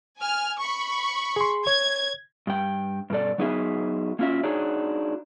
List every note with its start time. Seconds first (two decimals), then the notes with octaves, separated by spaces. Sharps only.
0.19 G#5 F6
0.58 B5 C#6
1.36 G#4 C6
1.67 C#5 G#6
2.47 G2 G5
3.10 G2 B2 A4 D5
3.38 F#3 B3 D#4 F#4 G#4 E5
4.19 A#3 C#4 F4 F#4 E5
4.43 D4 D#4 F#4 G#4 C#5